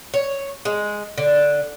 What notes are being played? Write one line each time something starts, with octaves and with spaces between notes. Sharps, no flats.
C#5
G#3
D3